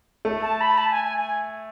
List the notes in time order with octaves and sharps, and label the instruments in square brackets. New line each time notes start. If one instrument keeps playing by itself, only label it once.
[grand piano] A3
[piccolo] A5
B5
A5
G#5
G#5
G#5